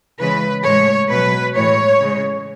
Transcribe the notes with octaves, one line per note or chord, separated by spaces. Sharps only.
C#3 E3 G#3 B4
A2 G#3 C#5
B2 F#3 B4
A2 E3 G#3 C#5
C#3 G#3